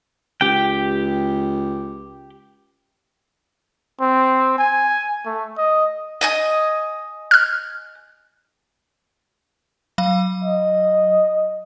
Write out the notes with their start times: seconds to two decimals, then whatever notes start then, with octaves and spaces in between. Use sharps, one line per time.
0.41 C#2 G4 G5
4.00 C4
4.58 G#5
5.26 A3
5.58 D#5
6.21 D#5 G#5 D#6
7.31 F6 F#6
9.98 F#3 F5
10.44 D#5